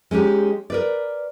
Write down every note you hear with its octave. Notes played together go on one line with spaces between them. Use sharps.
G#3 C#4 D#4 G4
A#4 B4 D5